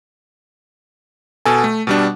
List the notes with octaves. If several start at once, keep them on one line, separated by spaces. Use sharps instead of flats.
B2 A4 G#5
A3
B2 G3 D4